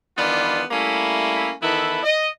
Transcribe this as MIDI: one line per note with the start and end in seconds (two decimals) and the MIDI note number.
0.18 0.63 51
0.18 0.63 52
0.18 0.63 55
0.18 0.63 59
0.18 0.63 62
0.18 0.63 65
0.71 1.52 55
0.71 1.52 57
0.71 1.52 58
0.71 1.52 61
0.71 1.52 64
1.62 2.00 51
1.62 2.00 52
1.62 2.00 59
1.62 2.00 64
1.62 2.00 69
1.62 2.00 71
2.03 2.28 75